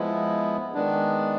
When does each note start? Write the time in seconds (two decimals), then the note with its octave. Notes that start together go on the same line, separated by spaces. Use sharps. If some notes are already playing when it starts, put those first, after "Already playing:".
Already playing: F3 G#3 B3 E4
0.74 D#3 G#3 B3 D4